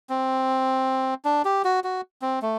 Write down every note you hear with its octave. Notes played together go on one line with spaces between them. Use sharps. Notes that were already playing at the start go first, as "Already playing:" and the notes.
C4
D4
G4
F#4
F#4
C4
A3